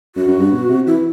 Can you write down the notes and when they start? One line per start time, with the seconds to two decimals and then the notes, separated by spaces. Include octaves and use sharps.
0.16 F#2 F#4
0.28 F#2
0.39 G2
0.52 B2
0.69 C3
0.87 E3 E4